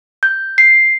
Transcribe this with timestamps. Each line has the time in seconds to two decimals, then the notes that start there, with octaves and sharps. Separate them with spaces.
0.23 G6
0.58 C7